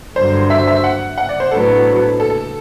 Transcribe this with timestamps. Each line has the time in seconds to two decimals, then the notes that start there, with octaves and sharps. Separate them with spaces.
0.16 G2 D3 F#3 C5
0.50 E5
0.67 E5
0.84 F#5
1.18 F#5
1.29 D5
1.40 C5
1.51 A2 F#3 B3 D4 A4
2.20 A4
2.30 A4